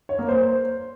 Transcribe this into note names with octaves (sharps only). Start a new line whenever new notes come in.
C#5
A#3
C5